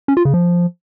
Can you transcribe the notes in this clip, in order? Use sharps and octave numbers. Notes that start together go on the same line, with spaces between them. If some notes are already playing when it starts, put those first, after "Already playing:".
C#4
F4
C#3
F3